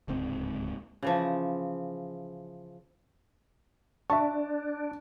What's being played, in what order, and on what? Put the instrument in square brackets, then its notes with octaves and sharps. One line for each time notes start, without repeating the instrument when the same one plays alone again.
[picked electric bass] D1 C#2 G#2 C4
[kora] C#3 E3 F3
[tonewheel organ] D4 [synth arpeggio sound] E5 C#6 [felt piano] A5